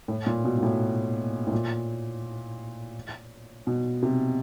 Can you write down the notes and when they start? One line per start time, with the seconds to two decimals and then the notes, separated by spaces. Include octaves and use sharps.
0.08 A2
0.26 A#2
0.44 B2
0.58 A#2
0.63 A2
1.47 A2
1.52 A#2
3.67 B2
4.03 C3